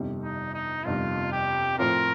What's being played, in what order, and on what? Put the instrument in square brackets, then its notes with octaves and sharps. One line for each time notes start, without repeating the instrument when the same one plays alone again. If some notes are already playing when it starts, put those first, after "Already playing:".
Already playing: [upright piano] G1 F2 C3 D#3 G3
[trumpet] D#4
D#4
[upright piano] G1 F2 C3 D#3 G3 [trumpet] F4
[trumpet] G4
[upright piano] A2 F3 C4 F4 [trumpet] A#4